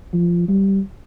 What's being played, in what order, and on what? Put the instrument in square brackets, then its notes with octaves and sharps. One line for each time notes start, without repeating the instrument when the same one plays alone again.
[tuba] F3
G3